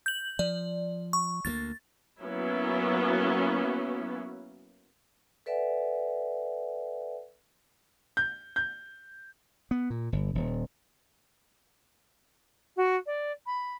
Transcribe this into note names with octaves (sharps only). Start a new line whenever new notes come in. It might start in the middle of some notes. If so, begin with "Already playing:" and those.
G6 F#7
F3 D5
C#6
D2 G#3 A#3 A6
F#3 A#3 B3 C#4 E4
A4 B4 D5 E5 F#5 G#5
G6
G6
B3
A#2
G1
D#1
F#4
D5
B5